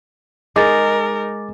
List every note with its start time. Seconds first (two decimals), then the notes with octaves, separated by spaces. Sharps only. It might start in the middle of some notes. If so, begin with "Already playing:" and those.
0.56 G#3 D#4 A#4 D6 A6